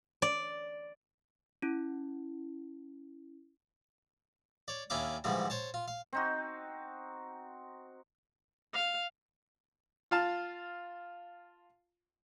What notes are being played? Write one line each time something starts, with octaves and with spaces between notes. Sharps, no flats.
D5
C#4 E4
C#5 D5
D#2 C#4 D4 E4 F5 D6
G#2 D3 E3 F3 G3 D4
C5 C#5 A5
F4
F5
C4 D#4 F#4
F5
F4 F5 A5